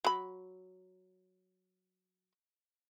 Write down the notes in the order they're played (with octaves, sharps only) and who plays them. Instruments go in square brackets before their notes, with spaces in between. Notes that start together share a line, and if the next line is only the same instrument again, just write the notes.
[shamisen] F#3 B5